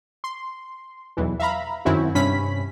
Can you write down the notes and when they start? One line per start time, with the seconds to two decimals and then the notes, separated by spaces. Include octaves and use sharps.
0.24 C6
1.17 B1 E2 E3
1.39 E5 F5 A#5 B5
1.85 F#2 D#3 C4 C#4 E4 F#4
2.15 G2 C3 C#4 B5 B6